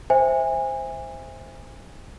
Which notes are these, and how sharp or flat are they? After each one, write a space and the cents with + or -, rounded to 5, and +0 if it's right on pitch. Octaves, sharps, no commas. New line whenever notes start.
C5 +0 E5 -10 G#5 -30